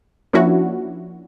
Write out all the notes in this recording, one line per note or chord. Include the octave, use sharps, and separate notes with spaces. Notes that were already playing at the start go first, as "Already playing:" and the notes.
F3 A#3 C#4 D4 E4 F#4